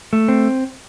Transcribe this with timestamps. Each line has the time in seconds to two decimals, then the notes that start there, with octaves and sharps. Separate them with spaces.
0.13 A3
0.28 C4